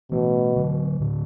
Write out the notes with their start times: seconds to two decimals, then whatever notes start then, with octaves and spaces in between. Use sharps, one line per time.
0.12 B2 E3 A3
0.56 D3 F#3
1.00 A2 D3